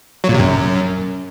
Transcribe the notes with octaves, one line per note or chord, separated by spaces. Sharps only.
F#3
A#2
C3
F#2